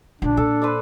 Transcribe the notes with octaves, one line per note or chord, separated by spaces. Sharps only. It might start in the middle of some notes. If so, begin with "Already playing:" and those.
A#1 C#3 D4
A#2 A4
B4 C5 D5